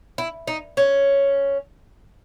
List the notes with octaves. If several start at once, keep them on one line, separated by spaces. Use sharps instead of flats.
E4
D#4
C#4